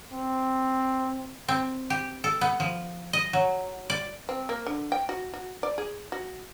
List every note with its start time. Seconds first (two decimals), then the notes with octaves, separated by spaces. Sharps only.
0.12 C4
1.48 C4
1.90 G4
2.24 A4
2.41 B3
2.60 F3
3.13 D#5
3.33 F#3
3.90 D5
4.29 C4
4.49 A#3
4.67 D3
4.92 G5
5.09 F#4
5.34 F#4
5.63 D5
5.78 G#4
6.12 F#4